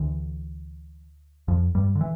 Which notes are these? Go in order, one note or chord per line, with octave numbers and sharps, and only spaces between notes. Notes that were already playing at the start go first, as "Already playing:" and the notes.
Already playing: D2 D3 E3
F2 F3
G2 G3
D3
E3